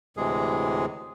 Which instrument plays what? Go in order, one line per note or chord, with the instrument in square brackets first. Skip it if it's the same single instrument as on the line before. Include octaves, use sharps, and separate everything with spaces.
[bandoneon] D2 A2 C3 E3 G#3 G#4